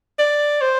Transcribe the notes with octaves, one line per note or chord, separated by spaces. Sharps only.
D5
C5